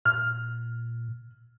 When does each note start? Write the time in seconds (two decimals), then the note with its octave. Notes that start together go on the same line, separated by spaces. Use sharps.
0.05 A#2 F6